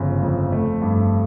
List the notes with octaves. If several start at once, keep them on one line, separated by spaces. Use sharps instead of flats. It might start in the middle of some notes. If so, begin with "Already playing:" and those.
Already playing: G1 C#3 F3
F2
A3
G2